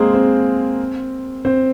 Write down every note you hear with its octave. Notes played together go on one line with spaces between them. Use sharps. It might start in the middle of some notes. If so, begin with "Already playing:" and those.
Already playing: G#3 A#3 C4 G#4 A#4 C5
C4 C5
C4 C5